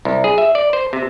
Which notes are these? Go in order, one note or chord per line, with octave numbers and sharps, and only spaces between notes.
C2
G#4
E5
D5
C5
C3